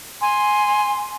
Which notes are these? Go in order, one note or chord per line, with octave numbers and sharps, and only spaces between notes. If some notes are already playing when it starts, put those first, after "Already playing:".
G#5 C6